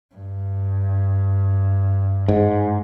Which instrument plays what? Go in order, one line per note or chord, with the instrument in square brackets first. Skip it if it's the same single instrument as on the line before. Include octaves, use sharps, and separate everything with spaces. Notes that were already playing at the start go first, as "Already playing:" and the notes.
[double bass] G2
[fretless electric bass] G#2